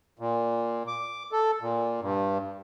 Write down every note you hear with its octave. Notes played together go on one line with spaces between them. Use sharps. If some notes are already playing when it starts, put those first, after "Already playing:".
A#2
D6
A4
A#2
G2